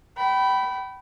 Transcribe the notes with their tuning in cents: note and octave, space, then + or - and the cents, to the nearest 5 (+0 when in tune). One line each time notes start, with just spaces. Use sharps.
G5 -30 B5 +0